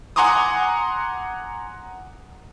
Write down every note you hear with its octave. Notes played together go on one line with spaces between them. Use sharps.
F#5 G#5 A#5 C6 D6 D#6